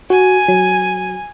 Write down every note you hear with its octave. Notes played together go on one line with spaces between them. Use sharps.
F#4 G#5
F#3